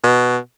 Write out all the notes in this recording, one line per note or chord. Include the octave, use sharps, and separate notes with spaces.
B2